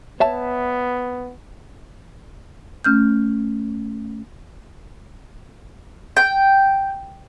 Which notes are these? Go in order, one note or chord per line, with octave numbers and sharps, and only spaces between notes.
B3 C#5 E5 A5
A3 C#4 F6 G6
G5